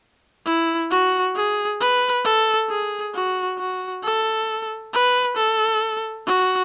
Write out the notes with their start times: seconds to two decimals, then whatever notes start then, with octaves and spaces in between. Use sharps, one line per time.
0.46 E4
0.91 F#4
1.36 G#4
1.80 B4
2.24 A4
2.70 G#4
3.15 F#4
3.58 F#4
4.03 A4
4.93 B4
5.37 A4
6.26 F#4